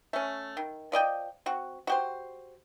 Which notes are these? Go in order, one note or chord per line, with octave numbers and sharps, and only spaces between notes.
A3 C#4
D#3
F3 D5 D#5 G5
C4 F#4
F#4 G4 C5